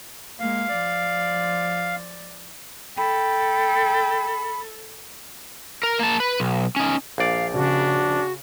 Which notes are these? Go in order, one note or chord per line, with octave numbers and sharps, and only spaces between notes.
G#3 A#3 F5
F3 D5
A4 G5 B5
A#4
A#3 A5
B4
B1
C#4 D#4
A#1 D5 F5
C#3 D4 F#4